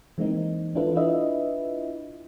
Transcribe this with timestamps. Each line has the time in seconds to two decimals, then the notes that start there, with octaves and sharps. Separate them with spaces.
0.18 E3 G#3 A#3 C4 D#4
0.75 E3 D4 E4 F4 A4 B4
0.96 D4 E4 F4 B4 D#5 E5